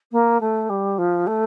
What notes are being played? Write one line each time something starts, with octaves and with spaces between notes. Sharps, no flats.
A#3
A3
G3
F3
A3